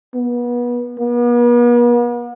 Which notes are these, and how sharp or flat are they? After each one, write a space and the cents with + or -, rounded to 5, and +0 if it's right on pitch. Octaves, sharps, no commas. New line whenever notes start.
B3 -30
B3 -45